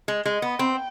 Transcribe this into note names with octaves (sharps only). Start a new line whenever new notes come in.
G#3
G#3 D#5
B3
C4 G5